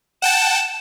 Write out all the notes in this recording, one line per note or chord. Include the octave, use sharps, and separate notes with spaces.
F#5 G5 A5 E7